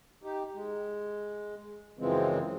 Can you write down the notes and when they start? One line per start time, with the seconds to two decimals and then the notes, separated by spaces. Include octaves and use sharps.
0.23 D#4 G4
0.54 G#3
1.99 F#2 C#3 E3 F3 G#3 C4